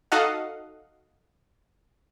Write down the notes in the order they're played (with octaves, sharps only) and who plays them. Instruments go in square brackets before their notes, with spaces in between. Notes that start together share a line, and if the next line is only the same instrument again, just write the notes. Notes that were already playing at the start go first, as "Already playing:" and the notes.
[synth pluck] D#4 F#4 A4 D#5 F5 F#5